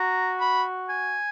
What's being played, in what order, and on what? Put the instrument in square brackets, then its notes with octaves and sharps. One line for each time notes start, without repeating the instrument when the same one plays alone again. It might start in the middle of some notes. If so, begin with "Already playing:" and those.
Already playing: [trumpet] F#4 [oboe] A#5
[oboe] B5
G#5